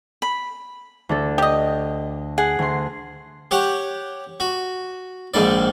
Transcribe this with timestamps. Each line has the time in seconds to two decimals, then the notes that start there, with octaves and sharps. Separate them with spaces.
0.22 B5
1.09 D2 D4 A4
1.38 G4 D#5
2.38 G#4 F#5
2.59 D2 C6
3.51 G4 C#5 F#5
4.40 F#4
5.34 A#1 G#2 D#3 D5